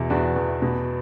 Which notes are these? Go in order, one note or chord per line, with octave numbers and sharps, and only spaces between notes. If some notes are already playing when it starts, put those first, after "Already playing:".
Already playing: E2 B2 E4
E2 D4 F#4
E2
B2